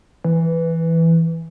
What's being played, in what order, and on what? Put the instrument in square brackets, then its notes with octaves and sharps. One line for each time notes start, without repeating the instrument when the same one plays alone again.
[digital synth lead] E3